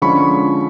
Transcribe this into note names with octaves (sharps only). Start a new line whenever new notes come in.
D3 F3 G#3 C#4 B5 C#6